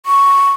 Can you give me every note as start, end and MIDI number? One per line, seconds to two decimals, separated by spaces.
0.06 0.52 85